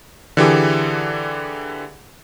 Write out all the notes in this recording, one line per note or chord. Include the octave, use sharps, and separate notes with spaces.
D3 E3 G4 G#4